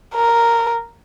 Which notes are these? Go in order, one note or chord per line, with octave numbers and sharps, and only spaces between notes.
A#4